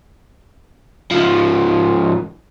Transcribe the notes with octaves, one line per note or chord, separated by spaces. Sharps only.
C#2 F3